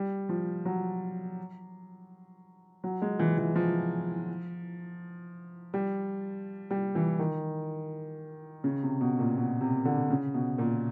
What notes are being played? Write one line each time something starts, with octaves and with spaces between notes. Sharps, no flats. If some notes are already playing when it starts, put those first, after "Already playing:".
Already playing: G3
F3
F#3
F#3
G#3
E3
E3
F3
G3
G3
E3
D#3
C#3
C3
B2
A#2
B2
C3
D3
C#3
B2
A#2